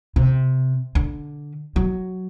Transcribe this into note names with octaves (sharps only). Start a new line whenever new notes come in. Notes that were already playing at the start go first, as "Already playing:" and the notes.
C3
D3
F#3